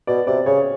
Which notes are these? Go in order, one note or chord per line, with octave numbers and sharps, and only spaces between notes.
B2 D5
C3 D5
C#3 C#5